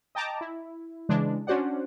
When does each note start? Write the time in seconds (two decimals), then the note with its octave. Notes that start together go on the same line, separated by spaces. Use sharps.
0.15 D#5 G5 A5 A#5 D6
0.41 E4
1.09 C#3 E3 G#3 D4
1.47 C#4 D4 F#4 C5 D5 F#5